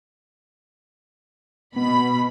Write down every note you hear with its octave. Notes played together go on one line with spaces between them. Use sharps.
B2 B3 B5